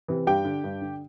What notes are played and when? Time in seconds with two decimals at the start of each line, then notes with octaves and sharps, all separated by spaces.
0.08 C3 E3
0.27 G2 G4 G5
0.45 D3
0.64 G2
0.81 D3